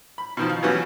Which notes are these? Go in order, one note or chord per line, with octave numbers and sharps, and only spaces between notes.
B5
B2 D#3 F3
F5
E3 F#3 G3 B3 C#4 F#4